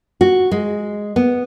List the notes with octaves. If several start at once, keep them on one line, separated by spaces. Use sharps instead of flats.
F#4
G#3
B3